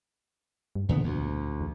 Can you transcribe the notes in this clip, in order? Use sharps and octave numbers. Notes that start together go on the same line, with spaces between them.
G2
E2 A#2 D3 B3
D2
E2